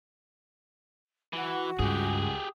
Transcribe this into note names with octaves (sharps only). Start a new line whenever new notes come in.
E3 F#4
C#2 G2 G4 G#4